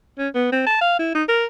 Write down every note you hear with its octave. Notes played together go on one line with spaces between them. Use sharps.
C#4
B3
C4
A5
F5
E4
D#4
A#4